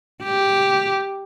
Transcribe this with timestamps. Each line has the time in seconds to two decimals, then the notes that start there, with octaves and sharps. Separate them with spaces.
0.23 G4